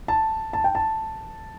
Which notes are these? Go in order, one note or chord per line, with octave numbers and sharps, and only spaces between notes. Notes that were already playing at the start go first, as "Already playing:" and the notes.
A5
A5
G5
A5